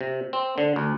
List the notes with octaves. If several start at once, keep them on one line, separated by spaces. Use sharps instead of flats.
C3
C4
D3
D2